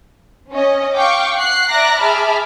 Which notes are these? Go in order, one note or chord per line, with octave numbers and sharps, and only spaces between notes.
C#4 D#5
F5 G5 C#6 D6
F#5 F#6 C7
D5 E5 A#5 D6 F#6 A#6
G#4 E5 A5 B5 D6 F6